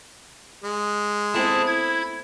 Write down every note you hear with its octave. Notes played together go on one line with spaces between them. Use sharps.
G#3
A3 B3 C4 E4 G#4 A5
E4 G#6